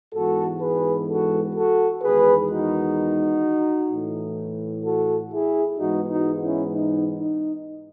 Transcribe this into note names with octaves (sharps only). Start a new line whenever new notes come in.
G#2 E3 G#3 B3 F#4 A4
G#4 B4
F#4 A4
F#4 A4
E2 D#3 G#3 B3 G#4 B4
D#4 F#4
A2 E3 A3
F#4 A4
E4 G#4
G#2 E3 G#3 B3 D#4 F#4
D#4 F#4
C#4 E4
D#4
D#4